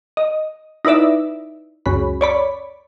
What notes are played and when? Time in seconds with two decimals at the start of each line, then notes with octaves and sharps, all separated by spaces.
0.17 D#5
0.85 D#4 E4 B4 D5 E5
1.86 C#2 F#2 B5
2.21 C#5 D5 B5